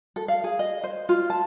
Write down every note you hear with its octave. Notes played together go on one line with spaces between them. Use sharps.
A4
F5
G#4
D#5
C5
F4
A5